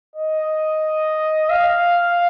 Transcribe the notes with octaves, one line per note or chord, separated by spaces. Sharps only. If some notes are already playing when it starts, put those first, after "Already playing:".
D#5
F5